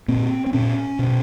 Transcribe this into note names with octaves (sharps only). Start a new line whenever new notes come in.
A#2 C4
C4
A#2 C#4
B2